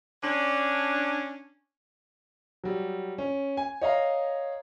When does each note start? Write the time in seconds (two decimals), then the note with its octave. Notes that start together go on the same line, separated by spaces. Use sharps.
0.22 C#4 D4
2.64 F#3 G3
3.18 C#4
3.57 G#5
3.81 C#5 D#5 F5 A#5